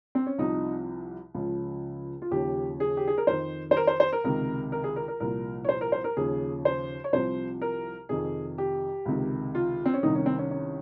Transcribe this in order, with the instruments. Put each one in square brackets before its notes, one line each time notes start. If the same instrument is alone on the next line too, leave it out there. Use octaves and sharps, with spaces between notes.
[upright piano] C4
C#4
C2 C3 F3 D#4
C#2 C#3 F3
F4
D#2 C#3 F3 G4
G#4
G4
G#4
A#4
F2 D#3 C5
C5
A#4
C5
C5
A#4
C#2 C3 D#3 A#4
A#4
G#4
A#4
A#4
C2 A#2 F3 A#4
C#5
C5
A#4
C5
A#4
D#2 C#3 F3 G#4
C5
C#5
C2 C3 F3 C5
A#4
F2 C3 D#3 G#4
G4
C#2 C3 D#3
F4
C4
C#4
C2 C3 D#3 D#4
C#4
C4
C#4
C#4